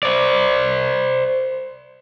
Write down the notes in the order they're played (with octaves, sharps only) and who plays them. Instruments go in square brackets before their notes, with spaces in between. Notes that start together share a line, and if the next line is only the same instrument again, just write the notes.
[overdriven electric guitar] C5 D5